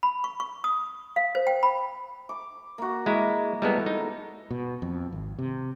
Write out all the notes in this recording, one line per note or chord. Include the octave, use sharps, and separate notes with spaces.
B5
C#6
C#6
D#6
F5
C5
G5
B5
D6
A#3 F#4
G#3 A#3 E4
G3 G#3 B3 E4 A4 A#4
D#4
B2
F2
G#1
C3